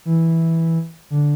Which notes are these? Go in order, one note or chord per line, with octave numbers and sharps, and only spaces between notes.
E3
D3